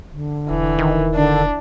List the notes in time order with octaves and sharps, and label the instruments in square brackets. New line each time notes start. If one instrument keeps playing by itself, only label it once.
[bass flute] D3
[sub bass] E1 [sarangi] E3
[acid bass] D#3
[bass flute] D3 [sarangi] D4